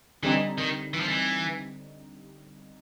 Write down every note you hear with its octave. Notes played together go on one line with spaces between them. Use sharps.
D3 E3 G3 C4 D#4
D#3
E3
F3
E3